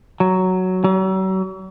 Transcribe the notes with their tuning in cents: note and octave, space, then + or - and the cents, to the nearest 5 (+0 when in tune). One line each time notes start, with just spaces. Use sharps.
F#3 +5
F#3 +40